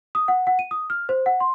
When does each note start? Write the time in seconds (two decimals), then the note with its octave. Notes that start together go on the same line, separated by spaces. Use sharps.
0.15 D#6
0.28 F#5
0.47 F#5
0.59 D#7
0.71 D#6
0.90 F6
1.09 C5
1.26 F#5
1.40 C6